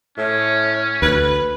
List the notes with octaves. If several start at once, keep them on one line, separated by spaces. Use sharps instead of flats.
A2 C#4
D2 B4